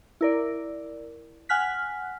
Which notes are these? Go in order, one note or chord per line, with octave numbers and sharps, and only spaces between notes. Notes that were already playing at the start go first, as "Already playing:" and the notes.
E4 A#4 D5
F#5 G#5 F6 F#6 B6